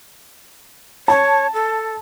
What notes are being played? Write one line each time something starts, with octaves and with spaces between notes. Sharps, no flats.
C#5 A5
A4